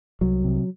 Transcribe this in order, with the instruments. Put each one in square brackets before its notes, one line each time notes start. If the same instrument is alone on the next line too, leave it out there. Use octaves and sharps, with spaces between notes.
[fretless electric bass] C2 F#3
C3